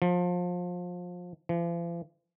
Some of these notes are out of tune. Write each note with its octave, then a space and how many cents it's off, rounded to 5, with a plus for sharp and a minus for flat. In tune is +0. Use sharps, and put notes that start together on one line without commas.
F3 +25
F3 -45